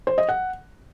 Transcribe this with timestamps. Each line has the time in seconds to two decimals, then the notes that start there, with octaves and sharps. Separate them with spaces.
0.07 C5
0.18 D#5
0.29 F#5